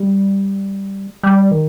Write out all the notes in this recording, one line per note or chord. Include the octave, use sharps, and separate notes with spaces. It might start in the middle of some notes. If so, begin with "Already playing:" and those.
Already playing: G3
G3
D#3